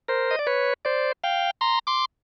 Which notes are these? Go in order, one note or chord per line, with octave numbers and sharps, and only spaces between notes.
A#4 C5
D#5
D5
B4 C#5
C5 D5
F5 G5
A#5 C6
C6 D6